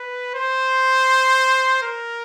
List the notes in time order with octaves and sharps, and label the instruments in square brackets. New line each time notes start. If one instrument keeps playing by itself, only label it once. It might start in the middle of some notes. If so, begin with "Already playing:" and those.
Already playing: [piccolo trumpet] B4
C5
A#4